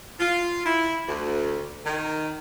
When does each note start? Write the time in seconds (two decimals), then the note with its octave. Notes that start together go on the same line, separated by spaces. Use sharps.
0.20 F4
0.66 E4
1.07 D2
1.85 D#3